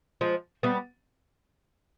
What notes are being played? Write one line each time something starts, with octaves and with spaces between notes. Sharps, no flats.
F3 G#3
G3 B3